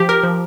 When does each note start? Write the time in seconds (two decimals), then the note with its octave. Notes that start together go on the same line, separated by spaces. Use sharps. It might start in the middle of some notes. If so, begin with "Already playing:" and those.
Already playing: F3 G4
0.09 A#4
0.24 F3